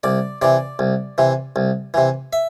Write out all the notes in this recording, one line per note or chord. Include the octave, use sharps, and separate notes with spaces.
C2 D5
C3 E3 D5
C2
C3 E3
C2
C3 E3
E5